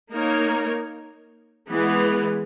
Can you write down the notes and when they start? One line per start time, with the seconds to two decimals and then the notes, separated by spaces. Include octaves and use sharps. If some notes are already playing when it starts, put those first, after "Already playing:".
0.14 A#3 D#4 A#4 C#5
1.69 E3 G#3 B3